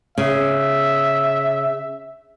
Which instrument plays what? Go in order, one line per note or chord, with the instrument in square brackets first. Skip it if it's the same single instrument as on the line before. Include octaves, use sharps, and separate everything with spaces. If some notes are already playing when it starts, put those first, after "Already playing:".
[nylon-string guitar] C#3 [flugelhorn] E5